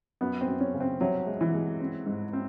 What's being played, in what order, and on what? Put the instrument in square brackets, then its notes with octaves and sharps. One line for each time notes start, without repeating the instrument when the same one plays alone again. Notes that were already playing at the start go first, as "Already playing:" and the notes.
[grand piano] F#2 [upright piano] B3
[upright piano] C4
[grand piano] F#2
[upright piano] C#4
[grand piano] C#3
[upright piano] C4
[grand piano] C2 [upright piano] F#3
[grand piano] G#3
[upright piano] E3
[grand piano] G#3
C4
G#2
C4